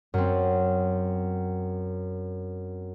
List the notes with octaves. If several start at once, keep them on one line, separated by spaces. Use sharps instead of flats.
F#2 C4